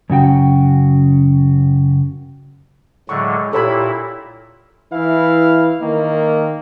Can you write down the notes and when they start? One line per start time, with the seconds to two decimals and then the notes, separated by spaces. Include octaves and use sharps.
0.10 F#2 C#3 F#4 G5
3.09 A2 D3 F#3 G#3 C#6
3.53 A#2 E4 G4 A4 C#5 B5
4.92 E3 E4 F5
5.80 D#3 A#3